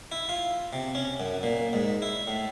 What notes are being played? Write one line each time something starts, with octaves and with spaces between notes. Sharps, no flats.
E4
F4
C3
C#4
F#2
A#2
G#2
E4
A2